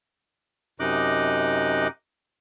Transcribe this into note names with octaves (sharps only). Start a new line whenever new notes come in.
F#2 C3 D#4 D#5 D6 F#6